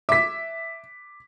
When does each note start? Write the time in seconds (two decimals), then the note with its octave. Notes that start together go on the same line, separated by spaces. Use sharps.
0.09 E5 D6 B6